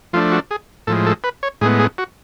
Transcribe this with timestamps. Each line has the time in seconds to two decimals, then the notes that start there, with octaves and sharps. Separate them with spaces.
0.13 F3 A3 D4 F4
0.32 F#4
0.51 G#4
0.87 A2 F3 G#3 A4
1.06 A4
1.24 B4
1.43 C#5
1.61 A2 G#3 B3 G#4
1.79 G#4
1.98 F#4